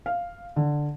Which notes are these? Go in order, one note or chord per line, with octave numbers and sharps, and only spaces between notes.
F5
D3